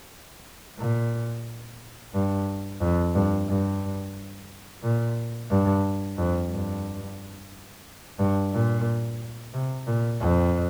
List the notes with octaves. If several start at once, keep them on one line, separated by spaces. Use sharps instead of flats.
A#2
G2
F2
G2
G2
A#2
G2
F2
G2
G2
A#2
C3
A#2
F2